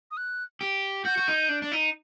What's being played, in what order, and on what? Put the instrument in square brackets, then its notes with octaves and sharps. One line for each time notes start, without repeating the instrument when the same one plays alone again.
[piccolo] D#6
F#6
[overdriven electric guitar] G4
[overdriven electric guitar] F#4 [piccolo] G6
[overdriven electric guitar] F#4
D#4
D4
D4
D#4